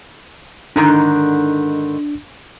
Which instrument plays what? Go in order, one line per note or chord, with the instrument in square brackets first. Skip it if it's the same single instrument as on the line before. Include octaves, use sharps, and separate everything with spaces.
[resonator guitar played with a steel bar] G#2 D3 D#3 [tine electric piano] D4